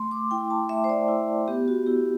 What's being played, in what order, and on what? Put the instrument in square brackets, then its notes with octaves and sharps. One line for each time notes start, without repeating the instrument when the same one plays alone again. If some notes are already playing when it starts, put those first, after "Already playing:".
Already playing: [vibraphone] A3 C6
D6
E4 G5
A5
A3 E5
C5
D5
E4
B3 G4
F#4
E4 G4